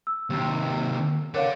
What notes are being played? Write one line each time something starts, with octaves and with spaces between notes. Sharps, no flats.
E6
D#2 C3
A#4 C#5 D5 F5 F#5